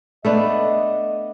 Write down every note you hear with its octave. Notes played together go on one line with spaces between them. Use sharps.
A3 B3 D4 D#5